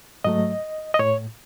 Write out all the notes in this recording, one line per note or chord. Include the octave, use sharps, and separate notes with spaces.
G#2 F#3 A3 D#5
D#5
A2 C#5